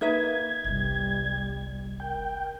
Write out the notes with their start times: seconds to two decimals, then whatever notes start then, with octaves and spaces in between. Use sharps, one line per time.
0.01 A#3 D#4 B4 E5 G#6
0.64 G1 C2 G3
2.00 A#4 G5